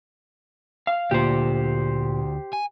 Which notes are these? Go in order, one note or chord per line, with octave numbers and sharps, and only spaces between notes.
F5
D2 A#2 G4 C5
G#5